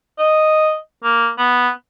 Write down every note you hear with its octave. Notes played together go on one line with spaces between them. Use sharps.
D#5
A#3
B3